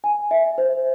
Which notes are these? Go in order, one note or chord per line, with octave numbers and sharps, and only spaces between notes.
G#5
E5
C5